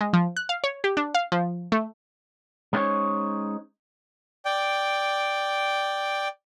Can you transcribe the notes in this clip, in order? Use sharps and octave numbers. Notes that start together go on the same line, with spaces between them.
G#3
F3
F#6
F5
C#5
G4
D4
F5
F3
A3
G#3 B3 C#4 D#4 C5 C#5
D5 G5